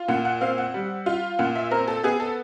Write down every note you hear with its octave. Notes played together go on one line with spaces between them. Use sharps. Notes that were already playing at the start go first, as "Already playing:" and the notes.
Already playing: F4
A#2 F#5
F#5
C4 F5
F#5
G3
F4
A#2 F#5
E5
C4 A#4
A4
B3 G#4
A4